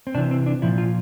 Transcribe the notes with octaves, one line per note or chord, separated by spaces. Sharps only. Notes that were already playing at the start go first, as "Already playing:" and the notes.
C4
C3 E3 D4
C4
D4
A#2 F3 E4
F4